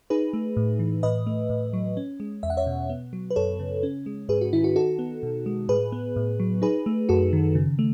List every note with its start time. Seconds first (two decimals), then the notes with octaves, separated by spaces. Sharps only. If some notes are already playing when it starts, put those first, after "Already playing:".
0.10 D#4 G#4 B4
0.33 A3
0.57 A2
0.79 E3
1.03 A2 B4 D#5
1.27 A3
1.50 A2
1.73 F#3
1.97 C#4
2.20 G#3
2.43 E2 E5
2.50 F#5
2.57 C#5 E5
2.67 B2
2.89 B3
3.13 F#3
3.30 B4
3.36 F#2 A4 C#5
3.59 C#3
3.83 C#4
4.06 G#3
4.29 G#2 G#4 B4
4.41 F#4
4.53 D#3 E4
4.64 F#4
4.76 D#4 F#4 A4
4.99 B3
5.23 B2
5.46 G#3
5.69 A2 G#4 B4
5.92 B3
6.16 A2
6.40 F#3
6.62 D#4 G#4 B4
6.86 A3
7.09 F#2 F#4 A4
7.33 D#3
7.55 C#3
7.79 A3